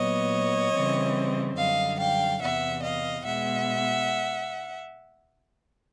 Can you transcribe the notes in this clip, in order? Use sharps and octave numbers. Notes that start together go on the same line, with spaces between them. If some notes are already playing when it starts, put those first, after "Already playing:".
Already playing: A#2 F#3 B3 C#5 D#5
C#3 E3 G3 C4
F#2 D3 G3 D#5 F5
F5 G5
E2 C3 E3 E5 F#5
D#5 F5
B2 G#3 B3 E5 F#5